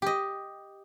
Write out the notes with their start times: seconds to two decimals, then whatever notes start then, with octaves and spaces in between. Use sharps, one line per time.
0.02 G4 D#5